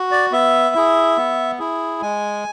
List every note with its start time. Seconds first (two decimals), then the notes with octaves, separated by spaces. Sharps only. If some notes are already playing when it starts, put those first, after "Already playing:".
Already playing: F#4
0.11 D5
0.32 B3 E5
0.75 E4 G#4
1.17 B3
1.59 E4 G#4
2.02 G#3 G#5